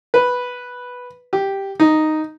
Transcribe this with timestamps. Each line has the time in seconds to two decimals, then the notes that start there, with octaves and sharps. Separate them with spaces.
0.14 B4
1.33 G4
1.80 D#4